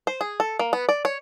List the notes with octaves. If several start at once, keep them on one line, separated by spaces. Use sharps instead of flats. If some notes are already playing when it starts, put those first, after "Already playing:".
C5
G#4
A4
A#3
B3
D5
C#5